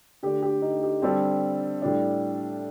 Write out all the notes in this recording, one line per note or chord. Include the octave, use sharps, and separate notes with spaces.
D3 A3 D4 G4
G4
D#4
G4
D3 G3 C4 A4
A2 G3 D4